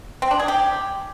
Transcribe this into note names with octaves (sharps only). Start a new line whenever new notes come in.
C4
D4
G#4
G4